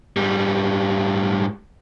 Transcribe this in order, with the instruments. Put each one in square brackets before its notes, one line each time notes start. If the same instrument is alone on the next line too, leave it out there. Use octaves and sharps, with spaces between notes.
[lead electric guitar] G#2 G3